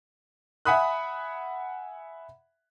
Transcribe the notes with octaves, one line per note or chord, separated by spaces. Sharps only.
E5 F#5 G#5 B5 D#6 F#6